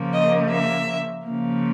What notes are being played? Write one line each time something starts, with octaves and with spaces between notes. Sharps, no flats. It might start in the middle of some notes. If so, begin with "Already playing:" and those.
Already playing: C#3 F3 A#3
D#5
E5
C#3 F3 A#3